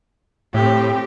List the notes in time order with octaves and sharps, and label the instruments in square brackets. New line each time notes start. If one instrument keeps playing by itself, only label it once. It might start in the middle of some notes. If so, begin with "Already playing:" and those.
[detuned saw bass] A2 [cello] C4 G4